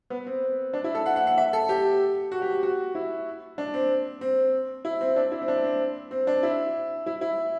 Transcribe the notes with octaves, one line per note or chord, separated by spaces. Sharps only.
B3
C4
D4
E4
A4
F#5
F#5
F#5
E5
A4
G4
F#4
G4
F#4
E4
D4
C4
C4
E4
C4
D4
E4
C4
D4
C4
C4
D4
E4
E4
E4